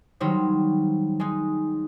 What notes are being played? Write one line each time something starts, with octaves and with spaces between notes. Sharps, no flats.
D#3 F#3 G3 D#4 C5 C#5
G#3 D#4